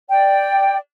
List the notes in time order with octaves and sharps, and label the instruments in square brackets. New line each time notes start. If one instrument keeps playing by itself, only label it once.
[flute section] D5 G5